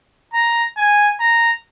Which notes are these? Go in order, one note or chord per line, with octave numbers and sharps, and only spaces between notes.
A#5
G#5
A#5